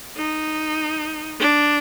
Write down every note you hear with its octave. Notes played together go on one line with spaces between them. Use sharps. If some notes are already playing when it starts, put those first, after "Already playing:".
D#4
D4